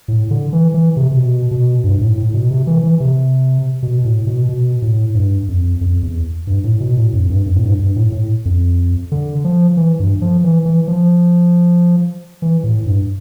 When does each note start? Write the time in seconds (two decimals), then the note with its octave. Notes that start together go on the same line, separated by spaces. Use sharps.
0.08 A2
0.31 D3
0.53 E3
0.74 E3
0.97 C3
1.12 C3
1.19 B2
1.51 B2
1.84 G2
2.01 A2
2.18 A2
2.34 B2
2.51 C3
2.67 E3
2.83 E3
3.00 C3
3.83 B2
4.05 A2
4.27 B2
4.49 B2
4.82 A2
5.15 G2
5.48 F2
5.81 F2
6.03 E2
6.47 G2
6.64 A2
6.80 B2
6.97 A2
7.13 F2
7.30 G2
7.46 F2
7.56 A2
7.63 G2
7.79 G2
7.96 A2
8.12 A2
8.45 F2
9.12 D3
9.44 F3
9.77 E3
10.00 G2
10.22 F3
10.44 E3
10.65 E3
10.88 F3
12.42 E3
12.64 A2
12.86 G2